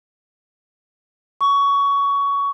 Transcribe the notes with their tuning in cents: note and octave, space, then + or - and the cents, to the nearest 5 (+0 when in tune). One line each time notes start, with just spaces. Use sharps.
C#6 +20